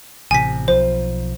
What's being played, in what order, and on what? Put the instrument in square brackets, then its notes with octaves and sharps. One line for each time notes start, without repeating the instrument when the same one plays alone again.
[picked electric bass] A1 C3 [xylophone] G#5 B6
[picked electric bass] B1 F3 [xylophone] C5